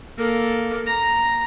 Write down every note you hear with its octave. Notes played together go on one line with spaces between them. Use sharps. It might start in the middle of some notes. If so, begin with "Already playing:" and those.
A#3 A4
A#5